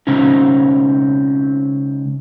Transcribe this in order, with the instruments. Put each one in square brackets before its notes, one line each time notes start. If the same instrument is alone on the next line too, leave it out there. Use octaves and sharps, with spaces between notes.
[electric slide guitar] C#3 G#3 C4 C#4 D#4